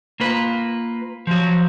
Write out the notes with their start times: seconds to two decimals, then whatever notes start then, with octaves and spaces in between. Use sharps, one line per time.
0.20 A#3 F4 B4
1.27 F3 F#3